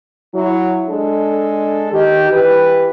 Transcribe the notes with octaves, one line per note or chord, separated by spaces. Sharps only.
F#3 E4
G#3 D4 A4
D#3 G4
E3 G4 B4